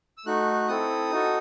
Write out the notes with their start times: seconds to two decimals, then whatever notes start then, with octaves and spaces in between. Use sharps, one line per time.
0.17 E6
0.26 A3 D#4 F#4 F#6
0.68 C4 E4 A4 D#6
1.11 D#4 F#4 A4